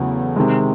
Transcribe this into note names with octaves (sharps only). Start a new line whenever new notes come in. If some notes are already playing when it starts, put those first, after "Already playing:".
Already playing: E2 C#3 F#3 A3
C3 D#3 G#3